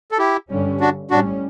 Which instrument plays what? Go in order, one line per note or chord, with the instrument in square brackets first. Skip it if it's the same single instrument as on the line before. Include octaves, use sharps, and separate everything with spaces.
[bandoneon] A4
E4 G4
[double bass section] G2 D3 G3 C#4
[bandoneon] D4 F#4
[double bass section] A2 G3 C#4 [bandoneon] D4 F#4